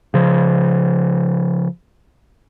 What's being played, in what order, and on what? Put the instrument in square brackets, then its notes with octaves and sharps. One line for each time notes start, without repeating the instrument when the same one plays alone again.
[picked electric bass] C#3 F3